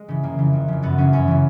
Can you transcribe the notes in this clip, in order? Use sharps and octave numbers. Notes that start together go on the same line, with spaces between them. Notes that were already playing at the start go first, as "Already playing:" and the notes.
Already playing: G#3
C#3 E3
F2 A#3
C#3 E3
F2
C#3 E3
F#2 B3
C#3 E3 C#4
F#2 C#4
C#3 E3